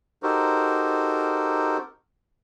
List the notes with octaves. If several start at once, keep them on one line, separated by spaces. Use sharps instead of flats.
D#4 F#4 G4 A4 A#4 C5